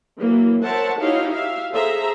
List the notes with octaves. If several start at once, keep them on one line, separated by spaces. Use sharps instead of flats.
E3 F#3 A#3
A#4 C5 C#5 E5 F#5 A5
D#4 E4 F#4 G4 C#5 F5
G4 E5 F5
G#4 A4 C5 E5 A#5